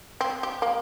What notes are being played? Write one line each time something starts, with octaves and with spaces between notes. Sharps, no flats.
C4
G4
A#3